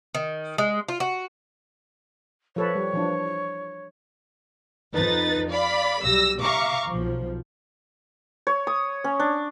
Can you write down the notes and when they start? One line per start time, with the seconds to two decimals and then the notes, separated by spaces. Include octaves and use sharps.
0.15 D#3
0.58 G#3
0.88 F4
1.00 F#4
2.56 F3 A4 B4 C#5
2.75 G3
2.93 E3 F3 D4
4.94 F2 D#4 B4 A6
5.51 D5 F5 B5
6.03 B1 G3 E6 A#6
6.41 E5 F5 A#5 C#6 D6
6.88 B1 F3
8.47 C#5
8.67 D#6
9.04 C#4
9.20 D4